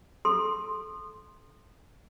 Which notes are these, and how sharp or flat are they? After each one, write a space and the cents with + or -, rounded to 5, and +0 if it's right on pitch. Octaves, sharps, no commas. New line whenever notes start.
A4 -25 C6 +0